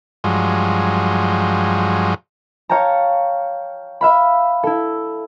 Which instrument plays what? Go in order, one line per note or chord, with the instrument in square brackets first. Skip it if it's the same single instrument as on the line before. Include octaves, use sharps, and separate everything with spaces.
[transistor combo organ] G2 F3 F#3 G#3
[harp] C#5 F5 G5 A5 A#5
E5 F5 B5
E4 A4